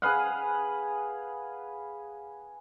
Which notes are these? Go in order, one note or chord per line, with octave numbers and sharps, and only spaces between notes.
G#4 B4 F5 F#5